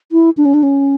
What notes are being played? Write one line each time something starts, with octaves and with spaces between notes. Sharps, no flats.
E4
D4
C#4
D4
C#4